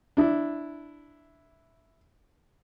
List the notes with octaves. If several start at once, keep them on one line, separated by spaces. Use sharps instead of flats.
D4 E4